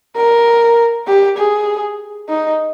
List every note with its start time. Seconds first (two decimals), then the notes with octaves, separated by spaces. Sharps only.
0.17 A#4
1.07 G4
1.38 G#4
2.29 D#4